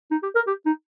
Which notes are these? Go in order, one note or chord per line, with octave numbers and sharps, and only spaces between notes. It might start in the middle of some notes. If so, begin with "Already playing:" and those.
D#4
G4
A#4
G4
D#4